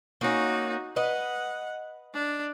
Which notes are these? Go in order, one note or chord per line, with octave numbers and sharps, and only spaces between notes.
A#3 C#4 D#4 F#4
B4 D#5 F#5
D4